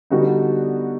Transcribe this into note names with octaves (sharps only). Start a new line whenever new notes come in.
D3 G3 B3 D#4 F#4